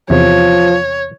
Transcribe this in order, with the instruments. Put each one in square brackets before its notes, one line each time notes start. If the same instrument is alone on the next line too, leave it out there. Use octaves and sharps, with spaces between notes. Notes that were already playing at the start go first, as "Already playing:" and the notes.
[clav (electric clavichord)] E2 C3 [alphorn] F3 [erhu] C#5